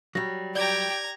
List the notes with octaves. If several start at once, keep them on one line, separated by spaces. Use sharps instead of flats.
F#3 G3 A#6
G4 D5 G5 A#5 G#6